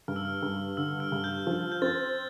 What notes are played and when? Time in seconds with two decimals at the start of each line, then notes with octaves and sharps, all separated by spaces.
0.08 G2 F6
0.16 E6
0.25 F6
0.43 G2
0.77 D3 E6
1.00 F6
1.12 G2
1.24 G6
1.47 F3
1.72 G6
1.82 C4 A6